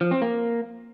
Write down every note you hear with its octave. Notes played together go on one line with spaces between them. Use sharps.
F3
C4
A#3